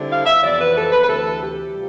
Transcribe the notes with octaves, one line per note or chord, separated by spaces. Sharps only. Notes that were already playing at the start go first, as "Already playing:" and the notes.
Already playing: D3 G3 C4 E4
F5
E5
F2 C3 E3 B3 D5
B4
A4
B4
B4
D2 C3 E3 A4
G4
C3 G3 F4